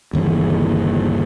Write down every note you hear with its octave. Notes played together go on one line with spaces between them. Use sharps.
G1 D#2 C#3 E3